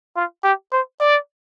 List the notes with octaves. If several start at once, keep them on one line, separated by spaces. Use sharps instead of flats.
F4
G4
C5
D5